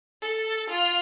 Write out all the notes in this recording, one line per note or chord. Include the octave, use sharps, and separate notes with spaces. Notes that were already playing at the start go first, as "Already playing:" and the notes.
A4
F4